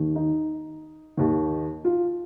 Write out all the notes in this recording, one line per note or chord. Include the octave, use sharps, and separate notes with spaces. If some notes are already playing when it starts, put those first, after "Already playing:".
Already playing: D#2 D#3
D#4
D#2 D#3
F4